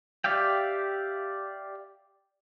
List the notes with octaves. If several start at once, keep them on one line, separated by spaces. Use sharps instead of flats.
G4 D5 E5 F5 G5